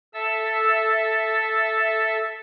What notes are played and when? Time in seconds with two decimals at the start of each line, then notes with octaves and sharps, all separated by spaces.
0.14 A4 E5 A5 E6